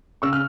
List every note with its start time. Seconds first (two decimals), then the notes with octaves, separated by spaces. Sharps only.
0.22 C#3 C#6 E6
0.33 F6